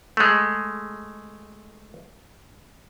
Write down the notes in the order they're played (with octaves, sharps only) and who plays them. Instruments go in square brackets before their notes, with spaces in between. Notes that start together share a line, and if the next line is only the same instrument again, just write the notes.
[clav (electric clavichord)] G#3 A3